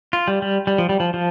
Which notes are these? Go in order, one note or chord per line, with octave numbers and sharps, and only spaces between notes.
F4
G3
G3
G3
F3
G3
F3
F3